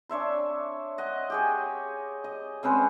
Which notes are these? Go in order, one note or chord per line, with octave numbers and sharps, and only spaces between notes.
D4 C#5 E5 C6
D#5 F#5
G4 G#4 C#5
D#5
G#3 C4 C#4 B4